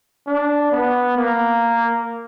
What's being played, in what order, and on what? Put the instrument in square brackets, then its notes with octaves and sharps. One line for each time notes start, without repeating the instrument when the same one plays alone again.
[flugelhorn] D4
B3
A#3